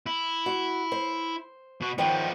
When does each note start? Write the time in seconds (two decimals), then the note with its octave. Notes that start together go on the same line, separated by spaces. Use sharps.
0.06 E4
0.46 F#4
0.92 C5
1.81 B2 F#4
1.98 D#3 F3 B3 C5 G5